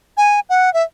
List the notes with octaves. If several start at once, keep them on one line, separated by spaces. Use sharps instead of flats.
G#5
F#5
E5